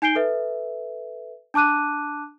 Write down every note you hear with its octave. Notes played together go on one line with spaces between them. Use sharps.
D#4 G#5 G6 C7 D7 G7
A4 B4 E5
D4 A5 D6 F#6 D#7